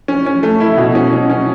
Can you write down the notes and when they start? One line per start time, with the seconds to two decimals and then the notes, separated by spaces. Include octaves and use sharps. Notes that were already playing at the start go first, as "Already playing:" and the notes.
0.08 C#4
0.26 C#4
0.43 A3
0.61 E4
0.77 B2
0.95 C#4
1.13 C#4
1.30 C#4